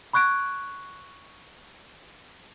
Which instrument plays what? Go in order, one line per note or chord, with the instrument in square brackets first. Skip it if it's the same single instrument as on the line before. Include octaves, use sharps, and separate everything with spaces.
[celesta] B5 C#6 F#6 G#6 D7